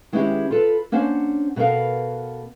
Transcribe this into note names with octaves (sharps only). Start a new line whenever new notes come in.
D#3 G#3 B3 C#4 E4 G4
F4 A4 B4
A#3 C#4 D4 C5 F#5
B2 B3 A4 A#4 F5